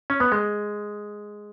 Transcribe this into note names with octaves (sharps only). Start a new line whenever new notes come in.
C#4
B3
G#3